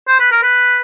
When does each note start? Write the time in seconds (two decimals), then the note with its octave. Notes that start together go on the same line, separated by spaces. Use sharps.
0.08 C5
0.20 B4
0.32 A#4
0.43 B4